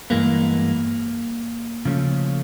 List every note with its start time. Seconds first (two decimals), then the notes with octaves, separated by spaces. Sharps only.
0.10 G2 E3 G#3 A#3 B3
1.85 C#3 F3 A3 C#4